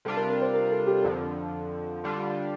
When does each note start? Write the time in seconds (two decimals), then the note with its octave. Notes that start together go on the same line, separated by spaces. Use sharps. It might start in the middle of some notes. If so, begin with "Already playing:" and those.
0.05 C3 G3 D4 F4 A4
0.17 A#4
0.30 A#4
0.42 C5
0.54 A#4
0.72 A4
0.87 G4
1.04 F2 D3 F3 A4
2.04 D3 G3 D4 F4